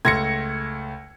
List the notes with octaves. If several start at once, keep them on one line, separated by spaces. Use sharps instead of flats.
C#2 A3 C6 G#6 A#6 C#7